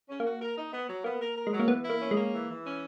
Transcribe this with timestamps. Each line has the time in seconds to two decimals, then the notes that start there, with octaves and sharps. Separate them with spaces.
0.09 C#4
0.20 A#3 F#4
0.41 A#4
0.56 D#4
0.73 B3
0.88 F#3
1.04 A#3 B3
1.21 A#4
1.36 A#4
1.47 G#3
1.53 F#3
1.59 A#3
1.68 E3 B3
1.84 E4
1.90 A#3
2.00 C#4
2.11 G#3 A#3
2.33 E3
2.49 E3
2.64 C#4